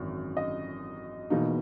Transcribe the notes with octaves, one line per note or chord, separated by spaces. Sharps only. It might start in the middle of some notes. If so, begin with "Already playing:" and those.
Already playing: G#1 F#2 E3
D#5
E1 E2 B2 A#3 D#4